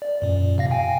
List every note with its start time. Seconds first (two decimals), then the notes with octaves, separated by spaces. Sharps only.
0.02 D5
0.22 F#2 A#2
0.58 C3 F5 A#6
0.70 F5 G5 G#5